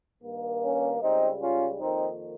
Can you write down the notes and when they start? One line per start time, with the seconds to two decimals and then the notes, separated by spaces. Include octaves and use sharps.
0.22 G2 D#3 A#3
0.62 C#4
1.01 C#2 C#3 G3 C4 D#4
1.41 C#4 F4
1.80 F2 D#3 A#3 C4 D#4